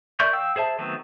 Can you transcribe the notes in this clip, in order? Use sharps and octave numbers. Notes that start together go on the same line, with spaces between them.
A#4 D5 E5 C#6 G6
F5 G5 E6
G#4 C5 E5 A5
D#3 F#3 A3 B3 C4